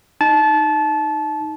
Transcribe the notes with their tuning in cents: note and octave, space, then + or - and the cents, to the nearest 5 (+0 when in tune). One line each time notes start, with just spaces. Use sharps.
D#4 +0 A5 -25